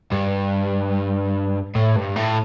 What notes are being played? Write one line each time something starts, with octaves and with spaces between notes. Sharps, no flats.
G2
A2
G2
A2